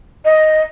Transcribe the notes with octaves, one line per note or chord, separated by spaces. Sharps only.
D#5